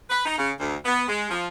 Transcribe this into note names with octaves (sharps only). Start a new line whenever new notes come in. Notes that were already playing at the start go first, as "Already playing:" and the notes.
B4
D#4
C#3
D2
B3
G#3
F3